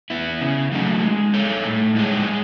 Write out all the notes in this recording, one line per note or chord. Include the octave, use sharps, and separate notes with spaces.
B3 E4
C#3
F#3 A3 D#4 F#4
G#3
D#4 A4 C#5
A2
G#3 D#4 G#4 C#5
G#3